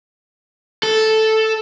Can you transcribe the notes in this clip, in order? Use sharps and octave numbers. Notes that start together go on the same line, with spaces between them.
A4